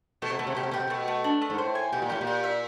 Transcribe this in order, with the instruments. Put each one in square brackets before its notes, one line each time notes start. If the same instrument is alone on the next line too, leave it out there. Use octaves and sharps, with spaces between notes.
[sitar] B2 [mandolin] A3
[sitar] C3
[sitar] B2 [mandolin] A3
[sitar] C3
[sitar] B2 [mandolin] G4
[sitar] C3
[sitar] B2 [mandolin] G4
[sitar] C3
[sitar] B2 [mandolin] A3
[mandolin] A3
D4
A3
[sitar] G#2
[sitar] A2 [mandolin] C5
[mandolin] G#5
[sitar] B2 [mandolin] G4
[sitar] A#2
[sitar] A2 [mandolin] G4
[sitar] A#2
[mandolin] G4
E5